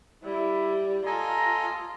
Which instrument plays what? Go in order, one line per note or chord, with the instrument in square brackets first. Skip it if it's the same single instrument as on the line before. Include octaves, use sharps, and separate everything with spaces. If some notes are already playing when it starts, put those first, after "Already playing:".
[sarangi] G3 [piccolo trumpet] E4
[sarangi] F4 [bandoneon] A4 D#5 G#5 [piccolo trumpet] A#5